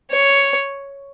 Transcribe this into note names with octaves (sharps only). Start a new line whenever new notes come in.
C#5